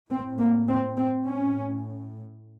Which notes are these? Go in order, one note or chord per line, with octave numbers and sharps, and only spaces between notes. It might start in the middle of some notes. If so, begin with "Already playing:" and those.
A2 C4
A#3
C4
C4
A2 C#4